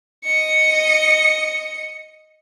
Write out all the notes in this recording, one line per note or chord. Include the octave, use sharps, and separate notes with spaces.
D#5 C#7